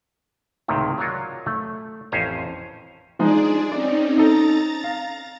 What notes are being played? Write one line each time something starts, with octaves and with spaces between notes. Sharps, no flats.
C#2 A2 C3 D#3
F#3 D4 F4 A#4 C#5 D#5
A3
A1 F2 C#4 C5 G#5 A#5
F3 G#3 D4 D#4 G#4 D5
C4 C#4 D#4 D5
D#4 A4 A#5 A6
F5